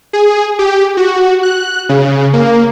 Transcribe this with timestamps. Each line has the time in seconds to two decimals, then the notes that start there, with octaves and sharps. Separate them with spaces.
0.13 G#4
0.59 G4
0.97 F#4
1.43 F#6
1.89 C#3
2.33 A#3